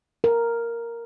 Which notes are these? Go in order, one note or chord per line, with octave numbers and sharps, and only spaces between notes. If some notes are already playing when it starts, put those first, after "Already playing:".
A#4